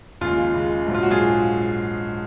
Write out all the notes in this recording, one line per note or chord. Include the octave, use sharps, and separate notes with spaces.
D#2 C#3 G#3 F4
D#2 C#3 G#3
A#1 G#2 F#3
F4
F#4
F4 G#4